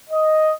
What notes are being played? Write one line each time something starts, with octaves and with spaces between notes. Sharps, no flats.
D#5